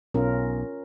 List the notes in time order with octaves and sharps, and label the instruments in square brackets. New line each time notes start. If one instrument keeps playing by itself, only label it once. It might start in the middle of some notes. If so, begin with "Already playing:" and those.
[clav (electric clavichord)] B1 [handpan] C#4 F4 A#4